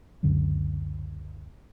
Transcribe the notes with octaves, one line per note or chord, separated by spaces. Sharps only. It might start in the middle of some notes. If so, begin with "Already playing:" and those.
C#2 F#2 D3 F#3